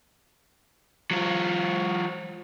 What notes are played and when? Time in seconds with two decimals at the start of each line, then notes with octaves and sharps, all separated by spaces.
1.11 F#3 F4